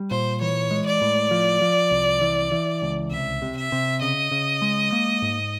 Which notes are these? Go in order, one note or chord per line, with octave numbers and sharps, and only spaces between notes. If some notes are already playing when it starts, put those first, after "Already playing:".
Already playing: G3
A#2 C5
E3 C#5
G#3
D5
A2
F3
F3
C2
E3
E3
C#2
C2 E5
C3
E5
C3
C#3 D#5
C#3
G#3
A#3
G#2